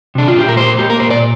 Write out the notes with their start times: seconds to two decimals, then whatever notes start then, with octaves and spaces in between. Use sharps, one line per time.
0.15 C3 D4
0.28 F4
0.36 A#2 G4
0.48 A#4
0.57 A#3 C5
0.79 A#3 G4
0.90 A#4
1.00 A#2 C5
1.10 D5